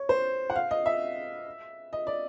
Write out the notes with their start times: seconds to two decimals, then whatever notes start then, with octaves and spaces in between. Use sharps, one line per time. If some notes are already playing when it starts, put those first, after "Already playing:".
Already playing: C#5
0.09 C5
0.50 F#5
0.56 F5
0.71 D#5
0.86 E5
1.93 D#5
2.07 D5